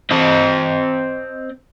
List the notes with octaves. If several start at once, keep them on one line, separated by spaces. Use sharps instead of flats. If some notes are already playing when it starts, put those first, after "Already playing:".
C4 D#5